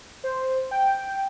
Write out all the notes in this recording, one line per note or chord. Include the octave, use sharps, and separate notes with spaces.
C5
G5